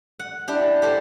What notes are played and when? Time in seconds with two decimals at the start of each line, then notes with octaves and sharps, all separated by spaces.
0.19 F#5
0.48 D4 E4 G4
0.82 G4 A4 C5